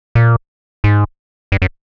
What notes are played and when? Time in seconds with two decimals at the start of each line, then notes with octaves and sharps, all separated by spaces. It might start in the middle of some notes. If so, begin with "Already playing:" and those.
0.15 A#2
0.84 G#2
1.52 G2
1.62 F#2